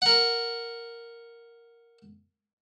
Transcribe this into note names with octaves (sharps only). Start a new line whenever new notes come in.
A#4 F#5